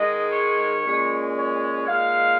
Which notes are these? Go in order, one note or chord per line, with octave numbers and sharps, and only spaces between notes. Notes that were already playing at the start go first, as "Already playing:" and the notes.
Already playing: G#2 D#3 G#3 D#4 D#5
C#5
A#2 G#3 C#4
C#5
A#2 G#3 D#4 F5